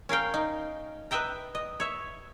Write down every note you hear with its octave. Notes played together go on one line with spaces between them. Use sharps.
C#4 A#4 F5 G5
D#4
B4 D#5 E5 G5 A#5
D#5
C#5 E5